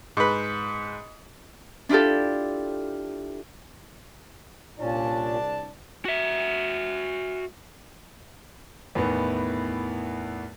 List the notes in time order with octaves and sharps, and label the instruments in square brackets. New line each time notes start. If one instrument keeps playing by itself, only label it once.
[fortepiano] G#2 B4
[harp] D4 E4 F4 G4 A4
[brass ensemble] C2 D4 A5 [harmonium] A#2 C#4
[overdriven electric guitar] F#4 E5
[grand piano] E2 A2 D#3 E3 B3